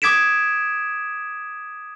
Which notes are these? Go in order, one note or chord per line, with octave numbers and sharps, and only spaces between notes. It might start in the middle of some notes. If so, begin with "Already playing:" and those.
D6 D#6 G#6 B6 D7 E7